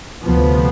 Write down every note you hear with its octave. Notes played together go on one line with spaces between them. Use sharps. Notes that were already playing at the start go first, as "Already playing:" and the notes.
D2 C3 F3 B3